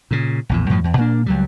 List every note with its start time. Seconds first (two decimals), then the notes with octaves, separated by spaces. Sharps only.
0.11 A#2 C#3
0.49 A#1 E2 A2
0.70 F#2 A2 F3 F#3
0.84 E2
0.97 A#2 A#3 D4
1.26 C#2 F#3 G3